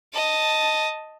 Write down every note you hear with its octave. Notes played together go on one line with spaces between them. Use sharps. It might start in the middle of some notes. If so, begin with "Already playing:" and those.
D#5 A5